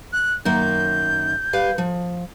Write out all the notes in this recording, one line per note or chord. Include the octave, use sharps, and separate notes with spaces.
F#6
F#2 D#3 A#3 G6
G3 B4 F5
F3